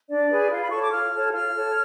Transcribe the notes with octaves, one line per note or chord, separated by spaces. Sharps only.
D4 D5
G#4 B4
F4 F5
B5
A4 C#5 C#6
D6
F4 F6
A4 C#5
F4 F6
A4 C#5